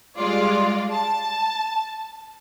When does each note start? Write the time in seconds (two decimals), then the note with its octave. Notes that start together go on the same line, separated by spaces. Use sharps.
0.18 G3 G#3 F4 D5
0.90 A5